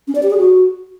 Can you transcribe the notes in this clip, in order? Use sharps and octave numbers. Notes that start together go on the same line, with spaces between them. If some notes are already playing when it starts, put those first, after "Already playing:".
C#4
D5
G4
G#4
F#4